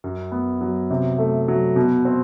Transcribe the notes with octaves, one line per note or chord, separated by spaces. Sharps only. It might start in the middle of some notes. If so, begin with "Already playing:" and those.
F#2
B3
F#3
C3
A3
F#3
B2
C4